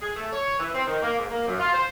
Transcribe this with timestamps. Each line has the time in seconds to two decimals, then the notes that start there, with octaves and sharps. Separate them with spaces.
0.02 G#4
0.16 A3
0.33 C#5
0.59 E3
0.74 C4
0.87 D#3
1.02 A#3
1.18 G#2
1.31 A#3
1.47 F#2
1.60 F4
1.74 C5